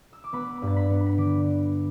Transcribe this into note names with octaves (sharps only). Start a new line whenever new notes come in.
E6
D6
B3 B4 B5
G2
A6
B5 B6
B3
B6
D3 D6 D7